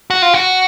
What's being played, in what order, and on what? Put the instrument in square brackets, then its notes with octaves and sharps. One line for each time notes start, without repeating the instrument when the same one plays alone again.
[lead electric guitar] F#4
F4
F#4